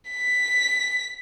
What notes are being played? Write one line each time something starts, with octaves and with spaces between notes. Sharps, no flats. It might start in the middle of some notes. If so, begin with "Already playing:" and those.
B6